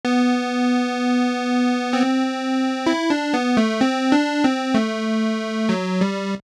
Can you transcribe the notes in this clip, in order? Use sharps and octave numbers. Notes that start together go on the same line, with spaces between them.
B3
C4
E4
D4
B3
A3
C4
D4
C4
A3
F#3
G3